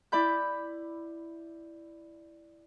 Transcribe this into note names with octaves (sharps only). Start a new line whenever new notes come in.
E4 D5 B5 G6